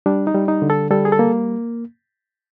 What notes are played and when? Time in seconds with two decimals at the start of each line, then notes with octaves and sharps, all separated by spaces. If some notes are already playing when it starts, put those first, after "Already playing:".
0.06 G3 D4
0.27 D#4
0.34 G3
0.48 D#4
0.62 D3
0.70 A4
0.91 G3 A4
1.05 G#4
1.12 A4
1.19 A#3